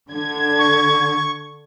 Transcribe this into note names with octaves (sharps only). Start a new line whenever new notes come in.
D3 G#6
C#6